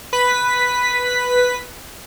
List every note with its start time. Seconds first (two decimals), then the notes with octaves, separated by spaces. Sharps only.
0.13 B4 B6